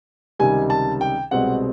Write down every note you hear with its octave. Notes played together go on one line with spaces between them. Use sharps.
C#2 C3 D#3 G3 G#5
A5
G5
C2 B2 G#3 C4 F#5